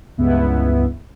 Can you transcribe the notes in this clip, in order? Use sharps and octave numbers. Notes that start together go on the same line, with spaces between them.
C#2 G2 B3 E4